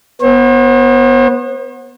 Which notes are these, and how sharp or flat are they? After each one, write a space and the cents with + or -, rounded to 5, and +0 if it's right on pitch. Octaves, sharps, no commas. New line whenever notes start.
B3 -10 C5 +45